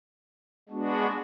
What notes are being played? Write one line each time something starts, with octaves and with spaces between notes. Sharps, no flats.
G#3 B3 D4 F#4